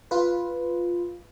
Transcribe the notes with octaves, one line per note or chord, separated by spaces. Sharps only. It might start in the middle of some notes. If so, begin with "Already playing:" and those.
F4 B4